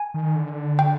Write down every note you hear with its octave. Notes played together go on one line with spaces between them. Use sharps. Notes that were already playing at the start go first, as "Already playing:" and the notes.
Already playing: G#5
D#3
D3
G5